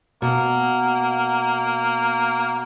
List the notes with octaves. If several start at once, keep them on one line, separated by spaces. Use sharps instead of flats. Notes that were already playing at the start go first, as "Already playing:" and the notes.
B2 A#3